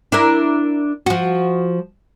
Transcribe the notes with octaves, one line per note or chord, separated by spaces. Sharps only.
D4 E4 A#4
F3 F#4